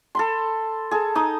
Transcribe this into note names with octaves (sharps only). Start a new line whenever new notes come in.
A4 B5 C6
G#4 A4
D#4 D#6